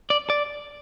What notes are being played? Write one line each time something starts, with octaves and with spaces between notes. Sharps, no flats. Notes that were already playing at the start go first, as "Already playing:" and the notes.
D5
D5